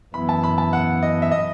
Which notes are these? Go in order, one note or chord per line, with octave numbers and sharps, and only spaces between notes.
F#2 E3 B3 E4 B5
A5
B5
A5
F#5
D#5
E5
D#5